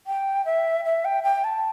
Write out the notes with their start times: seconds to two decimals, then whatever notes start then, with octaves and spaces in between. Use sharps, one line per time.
0.07 G5
0.45 E5
0.85 E5
1.05 G5
1.23 G5
1.44 A5